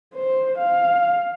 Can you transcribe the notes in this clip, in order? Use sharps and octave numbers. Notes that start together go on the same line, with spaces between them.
C5
F5